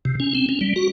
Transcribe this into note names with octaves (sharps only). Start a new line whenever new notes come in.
C3
C#4
C4
C#4
G3
F#4